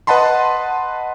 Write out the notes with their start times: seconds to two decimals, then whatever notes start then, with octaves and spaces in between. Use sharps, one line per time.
0.07 B4 D#5 F#5 A5 B5 C6